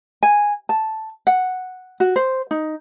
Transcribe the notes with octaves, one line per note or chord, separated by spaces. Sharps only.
G#5
A5
F#5
F#4
C5
D#4